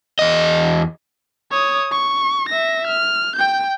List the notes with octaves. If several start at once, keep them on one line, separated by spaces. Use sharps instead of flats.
E2 D#5
C#5 D#6
C#6
E5 A#6
F6
G5 G6